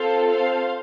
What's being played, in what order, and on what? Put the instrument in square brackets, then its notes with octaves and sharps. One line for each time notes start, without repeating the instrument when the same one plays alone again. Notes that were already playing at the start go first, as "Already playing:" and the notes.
Already playing: [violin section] C4 F4 A4 C5 F5
C5 F5